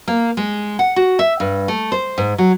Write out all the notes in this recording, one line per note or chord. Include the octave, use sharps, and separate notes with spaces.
A#3
G#3
F#5
F#4
E5
G2
A3
C5
G#2
F#3